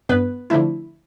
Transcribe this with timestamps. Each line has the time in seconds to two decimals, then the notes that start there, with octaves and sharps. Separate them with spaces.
0.09 G2 B3 B4
0.50 D3 F3 A3 E4